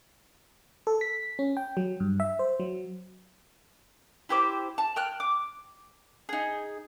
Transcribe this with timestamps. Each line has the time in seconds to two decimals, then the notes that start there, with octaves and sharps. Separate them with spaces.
0.87 A4
1.01 B6
1.39 C#4
1.57 G5
1.77 F#3
2.00 G2
2.20 E5
2.39 C5
2.60 F#3
4.29 E4 G4 C5 D6
4.78 A5
4.96 G5 F6 F#6
5.20 D6
6.29 D#4 G#4